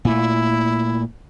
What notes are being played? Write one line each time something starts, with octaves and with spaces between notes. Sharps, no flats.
A#2 A3 E4